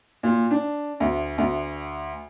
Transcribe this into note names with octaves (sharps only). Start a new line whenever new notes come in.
A#2
D4
D2
D2